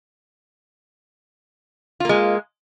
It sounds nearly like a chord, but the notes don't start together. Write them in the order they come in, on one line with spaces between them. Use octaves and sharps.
F4 A#3 G#3